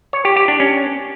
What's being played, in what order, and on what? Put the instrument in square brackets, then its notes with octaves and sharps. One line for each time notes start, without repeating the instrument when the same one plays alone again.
[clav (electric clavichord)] C#5
G4
G4
D4
C#4